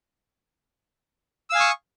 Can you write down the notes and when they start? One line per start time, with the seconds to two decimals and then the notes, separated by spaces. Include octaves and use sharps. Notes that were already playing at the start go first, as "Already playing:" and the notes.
1.50 E6
1.52 F5
1.55 G#5
1.58 D#6
1.60 C#6